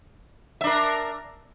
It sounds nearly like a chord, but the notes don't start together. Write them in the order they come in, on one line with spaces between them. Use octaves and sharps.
E5 D4 A#4